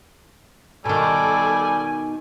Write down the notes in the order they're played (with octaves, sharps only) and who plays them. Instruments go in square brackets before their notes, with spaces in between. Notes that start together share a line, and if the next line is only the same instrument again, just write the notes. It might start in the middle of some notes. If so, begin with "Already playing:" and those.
[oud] B2 D#3 [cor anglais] G3 [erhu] A4 [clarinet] G#5